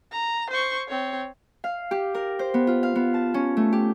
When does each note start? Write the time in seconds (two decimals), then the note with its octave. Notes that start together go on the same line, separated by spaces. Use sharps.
0.11 A#5
0.50 C5 C#6
0.88 C4 C#5
1.64 F5
1.91 G4
2.15 A#4
2.39 C5
2.54 B3
2.67 F4
2.83 F5
2.95 B3
3.14 A5
3.34 C#4
3.57 A3
3.73 G4